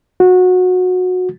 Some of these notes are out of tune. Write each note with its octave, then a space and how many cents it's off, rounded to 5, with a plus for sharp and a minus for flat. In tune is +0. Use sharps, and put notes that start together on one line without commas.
F#4 -20